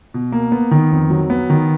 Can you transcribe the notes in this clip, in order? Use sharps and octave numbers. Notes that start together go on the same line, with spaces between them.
B2
A#3
B3
D#3
F2
F#3
B3
D#3